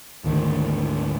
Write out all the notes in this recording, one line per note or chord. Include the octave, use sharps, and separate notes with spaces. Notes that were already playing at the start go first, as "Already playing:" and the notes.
G#1 D2 D#3